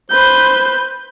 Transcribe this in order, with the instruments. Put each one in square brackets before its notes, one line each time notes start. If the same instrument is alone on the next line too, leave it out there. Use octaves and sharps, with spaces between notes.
[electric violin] B4 G6 [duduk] C5